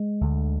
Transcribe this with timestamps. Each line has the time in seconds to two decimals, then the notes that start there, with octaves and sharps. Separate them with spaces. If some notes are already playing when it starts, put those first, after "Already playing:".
Already playing: G#3
0.21 D2 D3